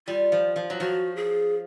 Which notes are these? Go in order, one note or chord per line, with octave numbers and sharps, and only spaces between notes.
G3 F4
F3
F3
F#3
F3 F#4
G#4